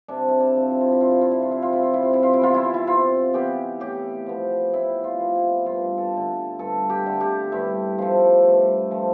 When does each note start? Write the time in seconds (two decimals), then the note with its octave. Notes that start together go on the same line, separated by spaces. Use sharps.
0.08 C3 D4
0.28 E4
0.40 D4
0.56 F3 C4
0.71 E4
0.81 F4
0.92 E4
1.01 C3 F4
1.11 E4
1.21 F4
1.31 E4
1.42 F4
1.49 F3 C4 E4
1.62 F4
1.73 E4
1.83 F4
1.94 C3 E4
2.03 F4
2.13 E4
2.23 F4
2.33 E4
2.41 E3 B3 F4
2.54 E4
2.64 F4
2.74 E4
2.87 C3 F4
3.34 E3 B3 G4
3.80 A2 G4
4.26 F3 B3
4.74 A2 E4
5.04 F4
5.19 F3 B3
5.35 E4
5.66 G2 F4
5.98 A4
6.13 D3 A3
6.59 G2 A4
6.90 G4
7.06 D3 A3
7.21 G4
7.52 G2 E4
7.98 F3 A3
8.45 G2
8.91 F3 A3